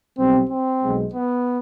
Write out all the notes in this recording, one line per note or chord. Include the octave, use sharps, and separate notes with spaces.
B1 B2 G3 C4
C4
B1 B2 G#3
B3